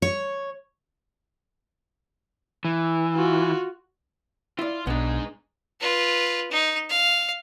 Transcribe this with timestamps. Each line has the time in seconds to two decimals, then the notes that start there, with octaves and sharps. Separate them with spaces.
0.02 C#5
2.65 E3
3.14 F4 F#4
4.59 E4 F4 D5
4.87 B1 G#3 B3 D4 D#4
5.81 F4 B4
6.51 D#4
6.90 F5